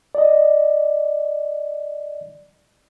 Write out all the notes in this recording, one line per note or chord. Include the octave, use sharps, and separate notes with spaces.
D5 D#5